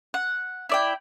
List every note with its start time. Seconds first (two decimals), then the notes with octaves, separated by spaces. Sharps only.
0.14 F#5
0.69 E4 D5 G5